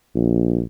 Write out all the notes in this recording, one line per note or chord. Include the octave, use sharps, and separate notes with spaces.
A#1